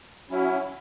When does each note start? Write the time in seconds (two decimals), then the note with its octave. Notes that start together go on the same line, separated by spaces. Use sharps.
0.29 F#3 C#4 E4